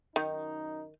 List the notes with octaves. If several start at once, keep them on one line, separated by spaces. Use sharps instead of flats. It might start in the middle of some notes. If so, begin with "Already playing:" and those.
F#2 D#3 D#4